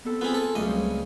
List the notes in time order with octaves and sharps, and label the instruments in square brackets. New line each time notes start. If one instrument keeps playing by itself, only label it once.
[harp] B3 C4 A4
[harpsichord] B3 C4 [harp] F4 G#4 G#5
[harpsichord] A4
[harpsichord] C#2 D#5 [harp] C#3 F#3 A3
[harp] G3 C4 C#4